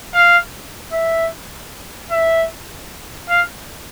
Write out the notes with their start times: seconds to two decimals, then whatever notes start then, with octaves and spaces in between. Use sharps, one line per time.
0.14 F5
0.92 E5
2.11 E5
3.29 F5